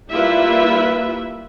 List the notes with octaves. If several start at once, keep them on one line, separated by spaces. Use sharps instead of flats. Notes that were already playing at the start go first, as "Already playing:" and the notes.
G3 A#3 E4 F4 B4 E5